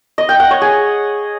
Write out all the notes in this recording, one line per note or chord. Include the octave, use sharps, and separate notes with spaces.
D#5
G5
F#5
C#5
G#4